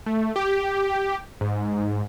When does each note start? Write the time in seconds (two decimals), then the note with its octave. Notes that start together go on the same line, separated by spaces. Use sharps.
0.06 A3
0.36 G4
1.41 G#2